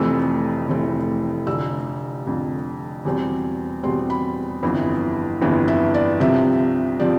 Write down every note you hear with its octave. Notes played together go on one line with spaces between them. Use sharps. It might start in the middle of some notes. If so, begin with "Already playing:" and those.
Already playing: F1 F2 E3 A3 C4 E6
F1 F2 E3 A3 C4
F1 F2 D3 E6
F1 F2 D3
E2 B2 G3 C4
E2 B2 G3 C4 C6
B5
G1 F2 E3 B3
G1 F2 E3 B3
E5
D5
C2 C3 F3 C4 E5
C3 F3 C4 D5